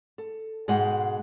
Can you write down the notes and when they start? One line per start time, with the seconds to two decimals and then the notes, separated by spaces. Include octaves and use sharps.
0.18 A4
0.68 G#2 B2 G#3 D#5 F#5 G5